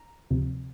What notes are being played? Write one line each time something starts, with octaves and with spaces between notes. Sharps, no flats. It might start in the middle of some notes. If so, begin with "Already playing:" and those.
Already playing: A#5
D2 C3 F3